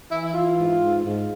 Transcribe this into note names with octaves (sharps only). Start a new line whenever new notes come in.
E3 E4
E4
E3 F4
G#2
G#2
G#2